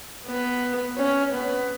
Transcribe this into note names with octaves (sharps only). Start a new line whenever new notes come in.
B3
C#4
B3